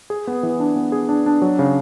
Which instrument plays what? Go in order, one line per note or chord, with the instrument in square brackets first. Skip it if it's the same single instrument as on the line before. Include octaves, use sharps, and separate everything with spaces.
[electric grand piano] G#4
B3
E3
D4
B3
G#4
D4
D4
F#3
C#3